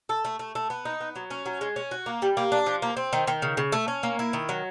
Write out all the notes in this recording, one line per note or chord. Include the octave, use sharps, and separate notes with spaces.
A4
A3
A3
A3
B3
D#4
B3
F#3
C#4
F#3
G#3
C#4
F#4
A#3
G3
A#3
D4
F3
A#3
C4
D#3
D#3
C#3
C#3
A3
C#4
A#3
E4
D#3
F#3